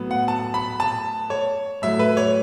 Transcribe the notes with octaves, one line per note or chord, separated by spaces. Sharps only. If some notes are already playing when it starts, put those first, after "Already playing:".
Already playing: A2 F#3 B3
F#5
A5
B5
A5
C#5
A2 F#3 A3 E5
B4
C#5